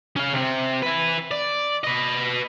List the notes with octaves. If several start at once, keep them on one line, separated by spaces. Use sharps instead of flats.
C#4 F5
C3 C4
E4 B4
D5
B4 D#5